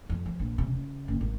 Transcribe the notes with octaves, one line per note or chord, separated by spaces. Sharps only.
F2
F3
A#1
C3
C#3
F#1
G#1